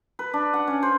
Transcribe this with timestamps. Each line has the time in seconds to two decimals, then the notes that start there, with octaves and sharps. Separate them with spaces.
0.19 B4
0.34 D4
0.54 F#5
0.67 C#4
0.83 C5